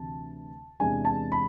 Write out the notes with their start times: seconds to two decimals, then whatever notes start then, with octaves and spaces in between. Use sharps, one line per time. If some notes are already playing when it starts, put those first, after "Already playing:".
Already playing: D2 C3 E3 A5
0.80 E2 C3 E3 G#3 D4 G#5
1.05 A5
1.32 B5